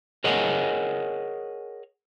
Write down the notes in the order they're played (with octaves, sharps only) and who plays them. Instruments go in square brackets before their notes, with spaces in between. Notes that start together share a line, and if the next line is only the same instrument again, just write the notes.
[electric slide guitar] G#4 A#4 C#5 D#5 F#5 G#5